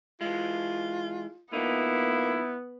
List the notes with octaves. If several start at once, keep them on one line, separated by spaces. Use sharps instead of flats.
E3 G#3 F4
F3 A#3 B3 D#4 E4